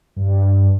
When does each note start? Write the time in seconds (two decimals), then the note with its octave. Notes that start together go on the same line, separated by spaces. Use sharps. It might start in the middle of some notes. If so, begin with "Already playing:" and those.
0.16 G2